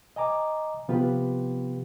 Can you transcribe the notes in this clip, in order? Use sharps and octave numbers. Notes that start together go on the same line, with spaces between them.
D#5 G#5 A#5 D6
C3 F3 B3 F4 G4 B4